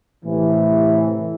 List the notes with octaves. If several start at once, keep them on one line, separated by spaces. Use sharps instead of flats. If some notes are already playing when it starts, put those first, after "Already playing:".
A2 C3 E3